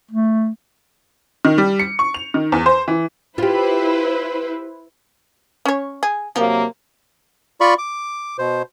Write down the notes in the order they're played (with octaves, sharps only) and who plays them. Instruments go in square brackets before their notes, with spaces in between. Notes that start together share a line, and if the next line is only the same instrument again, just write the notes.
[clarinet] A3
[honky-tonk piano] D#3
G3
C#7
C#6
F7
D#3
E2
C5
E3
[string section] E4 B4 C5 [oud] F4 G4
[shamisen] C#4 C#5
G#4
[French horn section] C3 F#3 A#3 [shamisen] F3
[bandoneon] F4 D5 B5 C#6
D6
B2 C5